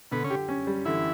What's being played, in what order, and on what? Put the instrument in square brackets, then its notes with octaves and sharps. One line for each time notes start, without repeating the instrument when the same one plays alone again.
[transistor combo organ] B2 B3 [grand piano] D3
[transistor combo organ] C#3 C#4
[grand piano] G4
C#4
G3
[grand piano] D3 [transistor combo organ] E3 E4